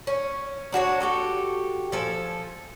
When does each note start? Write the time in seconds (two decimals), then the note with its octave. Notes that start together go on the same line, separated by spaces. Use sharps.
0.07 C#4
0.72 D4 F#4 G#4 C#5
1.00 F#4 G4 A4
1.92 F3 A4 G#5